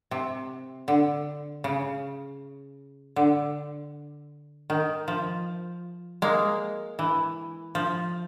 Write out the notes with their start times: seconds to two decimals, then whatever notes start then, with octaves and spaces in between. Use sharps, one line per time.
0.11 C3
0.88 D3
1.64 C#3
3.16 D3
4.70 D#3
5.08 F3
6.22 G#3 A#3
6.99 E3
7.75 F3